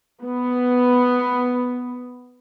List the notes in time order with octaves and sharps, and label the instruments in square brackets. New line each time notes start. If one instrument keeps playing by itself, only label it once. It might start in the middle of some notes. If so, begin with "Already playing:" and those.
[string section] B3